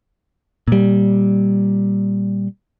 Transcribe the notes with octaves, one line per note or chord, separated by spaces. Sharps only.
A#2 G3